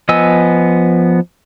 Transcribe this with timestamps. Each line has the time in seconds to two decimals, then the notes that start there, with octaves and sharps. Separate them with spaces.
0.09 F3 B3 D#5 G#5 E6